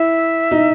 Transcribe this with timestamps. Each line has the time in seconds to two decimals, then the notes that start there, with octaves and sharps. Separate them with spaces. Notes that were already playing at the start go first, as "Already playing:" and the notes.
Already playing: E4 E5
0.51 D#4